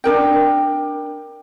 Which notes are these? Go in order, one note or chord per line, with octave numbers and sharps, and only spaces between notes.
D4 D#4 A#4 G5